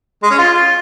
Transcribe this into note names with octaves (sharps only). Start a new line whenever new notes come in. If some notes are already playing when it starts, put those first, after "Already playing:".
G#3
C#4
F4